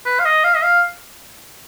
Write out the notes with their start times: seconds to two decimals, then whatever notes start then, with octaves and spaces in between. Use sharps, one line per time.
0.06 B4
0.20 F5
0.25 D#5
0.44 F5
0.55 D#5
0.63 F5